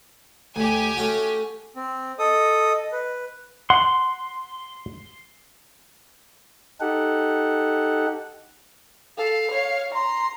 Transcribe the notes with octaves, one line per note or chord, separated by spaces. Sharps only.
D2 G4 G#5
A3 C#4 F#4
C4
A4 D#5 D#6
B4
F#5 C6
D#4 G4 A4 F#5
A4 F5
C#5
A#5 C6